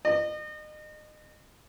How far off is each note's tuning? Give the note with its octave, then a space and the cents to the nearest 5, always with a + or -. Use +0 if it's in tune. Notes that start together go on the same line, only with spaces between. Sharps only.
D#5 -35